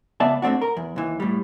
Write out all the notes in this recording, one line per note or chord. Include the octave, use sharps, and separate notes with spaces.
C#2 B3 D5 E5 A5
G#2 A3 C4 D4 F#4
A#4
E2
D#2 E3
A2 G3